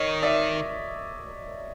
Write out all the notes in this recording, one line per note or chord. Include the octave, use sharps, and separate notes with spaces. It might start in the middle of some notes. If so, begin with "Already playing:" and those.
Already playing: D#3 C#5 D#5
D5 E5